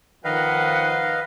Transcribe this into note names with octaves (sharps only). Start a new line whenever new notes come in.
D#3 F3 B4 D#5 F5 F#5